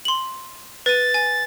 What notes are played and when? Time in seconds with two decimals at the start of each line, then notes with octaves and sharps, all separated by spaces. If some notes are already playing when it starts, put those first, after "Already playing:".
0.05 C6 F#7
0.86 B4 A6 D#7
1.14 G#5